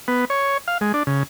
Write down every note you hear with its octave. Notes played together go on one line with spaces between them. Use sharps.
B3
C#5
F5
G#3
D4
C#3